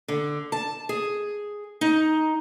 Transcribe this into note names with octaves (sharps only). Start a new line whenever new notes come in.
D3
A5
G#4
D#4